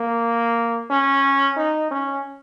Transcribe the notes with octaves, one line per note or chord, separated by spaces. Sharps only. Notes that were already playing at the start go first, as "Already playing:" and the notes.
Already playing: A#3
C#4
D#4
C#4